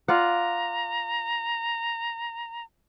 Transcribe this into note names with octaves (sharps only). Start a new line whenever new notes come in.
F4 D5 F#5 A#5